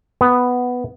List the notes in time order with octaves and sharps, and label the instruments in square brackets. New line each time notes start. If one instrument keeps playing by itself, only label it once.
[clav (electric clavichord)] B3